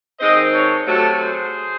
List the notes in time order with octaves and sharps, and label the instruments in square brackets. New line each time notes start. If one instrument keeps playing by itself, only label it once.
[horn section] D#3 G#3 C4 D#4 C5 D#5
A4 C#5
C3 F#3 A3 F#4 A4
G#4 C5